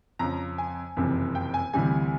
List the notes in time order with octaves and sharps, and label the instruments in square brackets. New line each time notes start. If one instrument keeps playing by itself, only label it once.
[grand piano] F2 C#3 F3 A#5
G#5
F#1 F2 C3 E3
G5
G#5
D2 C3 E3 G3 G#5